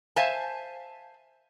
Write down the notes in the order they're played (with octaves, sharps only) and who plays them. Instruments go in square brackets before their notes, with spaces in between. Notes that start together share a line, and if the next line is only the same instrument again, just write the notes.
[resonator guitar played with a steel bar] C5 E5 F5 G#5 A5